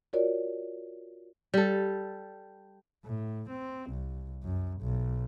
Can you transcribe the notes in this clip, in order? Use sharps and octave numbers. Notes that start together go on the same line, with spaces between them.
F4 F#4 A#4 C#5 D5
G3 A4
A2
C4
C2
F#2
B1